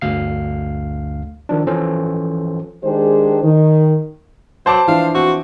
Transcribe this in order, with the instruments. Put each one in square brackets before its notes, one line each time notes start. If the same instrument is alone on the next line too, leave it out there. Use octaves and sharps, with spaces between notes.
[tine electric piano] G1 D2 F5 C7
D#3 F3 D4
E3 F3 C#4 A4 C5
[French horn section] D#3 G#3 D4 G4 G#4 C5
D#3
[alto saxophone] F#3 [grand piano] C5 A5 D6
[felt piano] E3 F3 D4 [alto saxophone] F5
[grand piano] C4 [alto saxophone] F#4